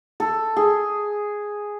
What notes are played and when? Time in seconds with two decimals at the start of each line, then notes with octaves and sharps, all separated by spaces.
0.20 A4
0.56 G#4